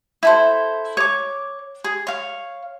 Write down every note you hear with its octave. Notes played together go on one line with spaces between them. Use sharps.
E4 A4 C5
C#5 D6
G#4
C#5 F5